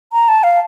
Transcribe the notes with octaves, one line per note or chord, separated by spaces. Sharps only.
A#5
A5
F5